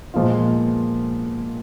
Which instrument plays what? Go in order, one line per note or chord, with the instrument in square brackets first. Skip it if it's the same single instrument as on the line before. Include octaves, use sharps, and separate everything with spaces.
[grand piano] A#2 F3 G#3 B3 F4